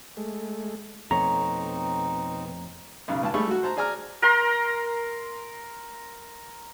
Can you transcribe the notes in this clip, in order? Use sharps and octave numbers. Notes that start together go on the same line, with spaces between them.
G#3 A3
F2 B2 A3 C4 D#4 C#5 A#5
B1 C#3
C#2 A5
G3 A3 G#4 B5 C#6
F#3 F#4
C5 A5 A#5
G#4 D5 G#5 A#5 F6
A#4 A#5 C6